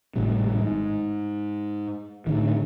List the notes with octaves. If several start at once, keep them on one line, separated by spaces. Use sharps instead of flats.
G#1 A2 C3 G3
G#2
A2 D3 D#3